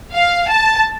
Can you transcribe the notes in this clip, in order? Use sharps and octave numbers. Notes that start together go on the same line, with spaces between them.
F5
A5